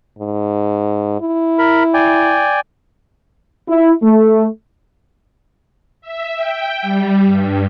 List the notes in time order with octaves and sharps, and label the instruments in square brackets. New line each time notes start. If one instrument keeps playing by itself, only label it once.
[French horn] G#2
E4
[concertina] A#4 B5
D5 G5 G#5
[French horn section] E4
A3
[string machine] E5
G5
G3
G2